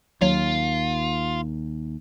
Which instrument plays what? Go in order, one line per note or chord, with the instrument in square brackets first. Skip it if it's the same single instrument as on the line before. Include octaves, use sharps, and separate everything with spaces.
[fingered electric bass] D#2 [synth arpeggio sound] F#3 [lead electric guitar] F4